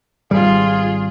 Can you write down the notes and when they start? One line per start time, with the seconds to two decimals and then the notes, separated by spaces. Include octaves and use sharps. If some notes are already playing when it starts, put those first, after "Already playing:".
0.31 G#1 G3 F4 G#4